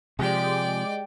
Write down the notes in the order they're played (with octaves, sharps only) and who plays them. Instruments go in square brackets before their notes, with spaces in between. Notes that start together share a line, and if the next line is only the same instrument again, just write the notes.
[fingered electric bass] C3 F3 [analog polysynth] G#3 G4 [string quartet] D5 G5